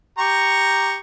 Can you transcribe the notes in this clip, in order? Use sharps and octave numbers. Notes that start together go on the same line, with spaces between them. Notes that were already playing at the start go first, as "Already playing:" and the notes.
G4 A#5 C#6